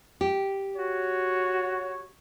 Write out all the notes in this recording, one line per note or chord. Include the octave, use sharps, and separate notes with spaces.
G4
F#4 C#5